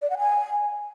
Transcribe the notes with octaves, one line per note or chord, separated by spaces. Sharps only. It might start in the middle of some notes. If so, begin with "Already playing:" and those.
D5
F#5
G#5